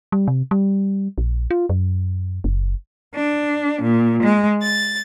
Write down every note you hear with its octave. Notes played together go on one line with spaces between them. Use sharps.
G3
C3
G3
A#1
F4
F#2
F#1
D4
A#2
G#3
A6